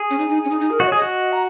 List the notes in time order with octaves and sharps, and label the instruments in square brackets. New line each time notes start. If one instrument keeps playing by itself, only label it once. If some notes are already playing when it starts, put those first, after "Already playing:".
Already playing: [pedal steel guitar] G#4
[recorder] C#4
D#4
D#4
C#4
D#4
D#4
A#4
[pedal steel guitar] F#4 [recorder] D#5
[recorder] C#5
[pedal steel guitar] G#4
[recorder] D#5
[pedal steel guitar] F#4
[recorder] A#5